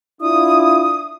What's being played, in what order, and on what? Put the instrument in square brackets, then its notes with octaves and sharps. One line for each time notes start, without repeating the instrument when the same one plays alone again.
[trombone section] D4 E4 F4 [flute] D#6